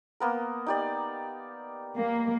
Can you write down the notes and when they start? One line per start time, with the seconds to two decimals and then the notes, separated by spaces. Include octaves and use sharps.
0.20 A#3 B3 A#4
0.67 D#4 G4 D5
1.97 A#3